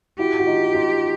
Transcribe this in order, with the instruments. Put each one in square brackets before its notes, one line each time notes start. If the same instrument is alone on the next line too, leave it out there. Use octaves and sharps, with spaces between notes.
[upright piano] E4 F#4 [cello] G4
[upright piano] F#4
D#4 F4
D#4 F4